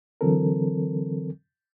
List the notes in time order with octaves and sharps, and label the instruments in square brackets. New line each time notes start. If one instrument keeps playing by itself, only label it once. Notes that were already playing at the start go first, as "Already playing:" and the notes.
[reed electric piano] D3 E3 F#3 C4 A4 A#4